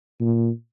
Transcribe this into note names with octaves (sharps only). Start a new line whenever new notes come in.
A#2